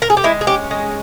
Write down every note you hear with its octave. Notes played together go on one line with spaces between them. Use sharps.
A#4
G#4
G4
G#3 E4
G#4
C#4 G4
G#3